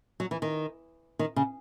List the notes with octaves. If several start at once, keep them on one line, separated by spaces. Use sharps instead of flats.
F#3
E3
D#3
D#3
C#3